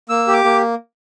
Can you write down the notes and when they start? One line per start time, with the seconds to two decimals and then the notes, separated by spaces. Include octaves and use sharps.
0.09 A#3 E6
0.28 G4
0.33 D6
0.44 A#3